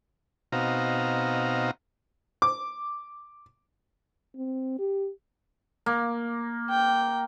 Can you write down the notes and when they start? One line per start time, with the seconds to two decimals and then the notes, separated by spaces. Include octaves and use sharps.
0.52 B2 C4 D#4 F#4 F5 A#5
2.42 D6
4.36 C4
4.79 G4
5.86 A#3
6.70 G5